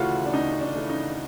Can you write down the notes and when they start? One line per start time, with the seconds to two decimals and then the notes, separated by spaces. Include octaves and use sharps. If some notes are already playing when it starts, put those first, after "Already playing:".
Already playing: D2 C#3 E3 A3 F4 F#4
0.26 D4
0.33 D2 D#4
0.61 D4
0.75 C#3 E3 A3
0.90 D#4